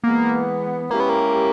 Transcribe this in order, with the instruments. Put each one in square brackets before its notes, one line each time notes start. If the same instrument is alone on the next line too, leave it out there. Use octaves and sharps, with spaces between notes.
[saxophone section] E3 G#3 B3 [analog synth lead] A#3
[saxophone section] G#3 C#4 E4 G4 [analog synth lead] A#3
[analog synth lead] B3
A#3